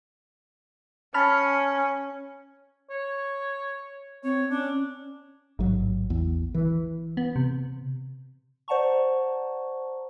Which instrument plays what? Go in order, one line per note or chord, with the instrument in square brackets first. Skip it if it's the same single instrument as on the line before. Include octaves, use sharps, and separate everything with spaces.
[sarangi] C#4 [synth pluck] A5 B5 F6
[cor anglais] C#5
[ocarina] C4 [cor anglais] C#5
[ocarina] C#4 [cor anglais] D4
[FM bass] A1 [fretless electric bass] G#2 F#3
[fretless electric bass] E2
E3
[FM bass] B3
C3
[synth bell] C5 D5 F#5 A5 A#5 C#6